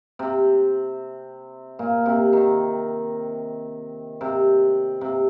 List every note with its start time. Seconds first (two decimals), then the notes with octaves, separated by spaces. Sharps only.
0.19 C3
1.79 A#2
2.06 C3
2.33 D#3
4.21 C3
5.01 C3